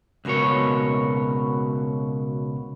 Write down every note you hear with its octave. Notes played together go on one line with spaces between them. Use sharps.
C#2 B2 F#4 A#4 C#5